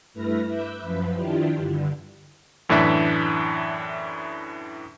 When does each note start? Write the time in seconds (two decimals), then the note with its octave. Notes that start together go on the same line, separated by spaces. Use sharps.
0.14 G2 A3 E4 B4 F6 A#6
0.46 B4 E5 D6 E6 F#6 G6
0.81 F#2 F3 B4
1.14 D#3 D4 E4 F4 G4
1.56 G2 D3
2.69 F#2 A2 E3 D4 E5 B6